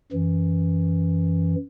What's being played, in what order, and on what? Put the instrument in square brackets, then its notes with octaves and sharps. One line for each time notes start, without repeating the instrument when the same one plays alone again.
[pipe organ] F#2 E3